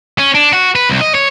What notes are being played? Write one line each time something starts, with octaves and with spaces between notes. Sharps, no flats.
C#4
D4
F#4
B4
C2
D#5
C#5